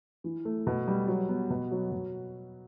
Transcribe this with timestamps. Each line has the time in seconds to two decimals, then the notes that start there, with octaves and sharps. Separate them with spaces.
0.24 E3
0.45 A3
0.67 B2
0.88 G3
1.08 F#3
1.29 B3
1.50 B2
1.71 F#3
1.92 B2